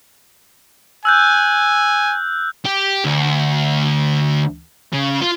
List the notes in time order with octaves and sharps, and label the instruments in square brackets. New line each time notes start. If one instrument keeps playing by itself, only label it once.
[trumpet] G#5 [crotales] E6 F#6 G6
[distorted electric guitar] G4
D2
C#3
F4